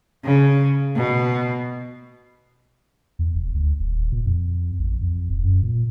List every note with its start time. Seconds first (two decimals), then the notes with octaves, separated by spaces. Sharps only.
0.24 C#3
0.96 B2
3.19 E2
3.35 F1
3.55 D2
3.80 D#1
4.12 A#2
4.26 F2
4.79 A1
5.01 F2
5.30 E1
5.44 F#2
5.63 A#2